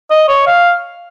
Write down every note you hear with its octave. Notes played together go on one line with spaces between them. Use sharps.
D#5
C#5
F5